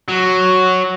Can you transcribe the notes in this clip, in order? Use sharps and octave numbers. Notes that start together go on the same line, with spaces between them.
F#3